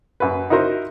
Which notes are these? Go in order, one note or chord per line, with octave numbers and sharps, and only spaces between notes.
F#2 B4
D#4 E4 F#4 A#4 C5